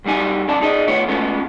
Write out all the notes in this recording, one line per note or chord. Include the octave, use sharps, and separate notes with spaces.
C2 F#3 G3 D#4 G#5
F2 D3 C#4 D5 A5
D#4 G#4 D5 D#5
D#3 A3 B3 F4 C#5
G#3 A3 B3 C#4 F4 A4